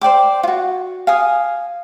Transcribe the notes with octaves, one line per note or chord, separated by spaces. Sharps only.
C5 D5 G5 D6
F4 F#4
F5 G#5 D#6